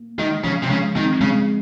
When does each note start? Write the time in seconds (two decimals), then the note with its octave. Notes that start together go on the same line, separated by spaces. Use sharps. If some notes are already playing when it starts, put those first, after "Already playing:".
Already playing: A#3
0.18 D#3 G#3
0.44 C#3 F3
0.63 C3
0.70 C#3 G#3
0.96 D#3 C4
1.21 C#3 G#3